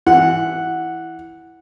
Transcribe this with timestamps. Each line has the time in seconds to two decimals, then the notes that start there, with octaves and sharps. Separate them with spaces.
0.07 E3 F#5